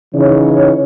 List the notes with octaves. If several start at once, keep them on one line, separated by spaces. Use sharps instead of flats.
C#3 E3 D#4 C#5